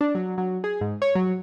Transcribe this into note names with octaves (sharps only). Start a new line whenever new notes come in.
D4
F#3
F#3
G#4
G#2
C#5
F#3